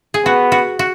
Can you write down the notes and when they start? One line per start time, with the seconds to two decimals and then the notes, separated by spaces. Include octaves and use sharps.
0.14 G#4
0.25 B3 F#4
0.52 F#4
0.79 F#4